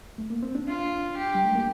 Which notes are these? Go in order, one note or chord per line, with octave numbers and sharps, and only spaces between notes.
A3
A#3
C4
D4
F4
G4
G3
A3
A#3